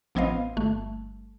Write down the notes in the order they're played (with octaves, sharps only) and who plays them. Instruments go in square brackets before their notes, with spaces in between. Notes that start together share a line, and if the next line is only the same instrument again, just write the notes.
[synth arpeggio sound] A1 F3 B3 C4 D#5 F5
G1 A3